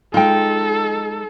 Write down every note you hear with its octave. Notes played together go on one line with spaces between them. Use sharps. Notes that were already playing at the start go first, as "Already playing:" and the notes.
G#3 D#4 F4 A4 G5